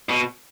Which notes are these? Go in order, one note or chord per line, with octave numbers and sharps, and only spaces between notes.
B2